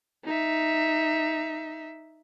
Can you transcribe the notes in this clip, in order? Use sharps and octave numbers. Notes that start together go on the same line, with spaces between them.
D#4 E5